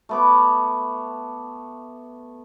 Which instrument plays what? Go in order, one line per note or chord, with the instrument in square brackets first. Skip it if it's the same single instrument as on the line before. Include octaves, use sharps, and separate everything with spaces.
[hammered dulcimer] A3 B3 D6